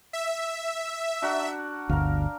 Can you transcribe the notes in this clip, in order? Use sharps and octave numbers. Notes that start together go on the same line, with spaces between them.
E5
D4 F#4 A#4
G1 D2 A#4 F5